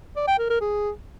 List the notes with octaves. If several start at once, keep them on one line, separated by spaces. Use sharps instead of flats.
D5
G5
A#4
A#4
G#4